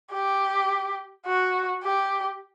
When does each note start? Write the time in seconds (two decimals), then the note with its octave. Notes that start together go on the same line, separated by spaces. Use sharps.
0.13 G4
1.27 F#4
1.83 G4